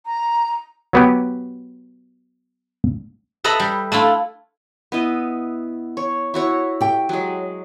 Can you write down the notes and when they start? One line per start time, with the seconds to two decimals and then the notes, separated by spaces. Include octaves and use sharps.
0.06 A#5
0.93 F#3 B3 G4
3.44 A4 B4 D#5 E5 A#5 B5
3.60 G3
3.92 A3 D4 E4 F4
4.92 B3 E4 D#5
5.97 C#5
6.34 E4 F#4 C#5
6.81 G4 G5
7.09 F#3 G#3